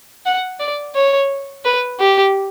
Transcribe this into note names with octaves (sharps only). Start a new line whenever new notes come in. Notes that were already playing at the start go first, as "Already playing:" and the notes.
F#5
D5
C#5
B4
G4